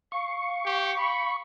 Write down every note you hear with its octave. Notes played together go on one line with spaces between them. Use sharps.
F5 C#6
G4
B5